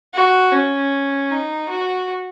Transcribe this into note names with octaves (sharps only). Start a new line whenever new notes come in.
F#4
C#4
D#4
F#4